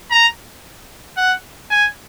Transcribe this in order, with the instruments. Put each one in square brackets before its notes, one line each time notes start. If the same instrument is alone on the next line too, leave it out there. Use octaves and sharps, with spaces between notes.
[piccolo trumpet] A#5
F#5
G#5